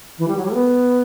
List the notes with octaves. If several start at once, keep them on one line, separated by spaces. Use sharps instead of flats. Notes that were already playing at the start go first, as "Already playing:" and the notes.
E3
G3
F#3
G3
A3
B3